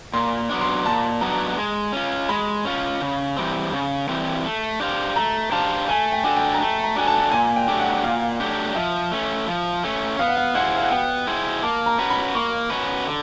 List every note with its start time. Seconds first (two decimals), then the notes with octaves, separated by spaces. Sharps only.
0.14 A#2 C6
0.50 F#3 B3 D4
0.61 C6
0.85 A#2 A5
1.21 F#3 B3 D4 A#5
1.57 G#3
1.93 C#4 F4
2.29 G#3 B5
2.65 C#4 F4
3.01 C#3
3.37 E3 G3 C4
3.72 C#3
4.09 E3 G3 C4
4.44 A3
4.80 D4 G4 C5 F5
5.16 A3 A#5
5.52 D4 G4 C5 F5 A5
5.88 A3 G#5
6.12 G5
6.24 D4 F#4 A4 G#5
6.36 G5
6.54 A#5
6.60 A3 A5
6.84 A#5
6.96 D4 F#4 A4 G#5
7.08 A5
7.32 A#2 G#5
7.56 G5
7.68 F#3 A3 D4 G4
7.80 F#5
8.04 A#2 F5
8.40 F#3 A3 D4 G4
8.75 F3 E5
9.12 A3 C#4
9.47 F3
9.83 A3 C#4
10.19 B3 F5
10.28 F#5
10.37 F5
10.55 E4 G#4 C5 F#5
10.76 F5
10.83 F#5
10.91 B3 G5
11.27 E4 G#4 C5
11.63 A#3 A5
11.86 A#5
11.98 C#4 F#4 B4
12.10 B5
12.35 A#3 C#6
12.70 C#4 F#4 B4
13.06 D3